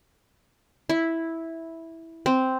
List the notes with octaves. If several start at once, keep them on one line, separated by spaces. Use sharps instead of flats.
E4
C4